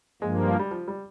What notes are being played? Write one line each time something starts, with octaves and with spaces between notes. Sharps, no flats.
G2 F3 G#3 A#3
G3
F3
G3